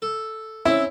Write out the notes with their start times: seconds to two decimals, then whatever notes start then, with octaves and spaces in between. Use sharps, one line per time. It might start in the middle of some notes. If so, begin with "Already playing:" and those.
0.02 A4
0.66 C4 C#4 E4